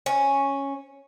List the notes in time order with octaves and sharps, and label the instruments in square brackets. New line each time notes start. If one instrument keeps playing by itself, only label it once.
[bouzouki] C#4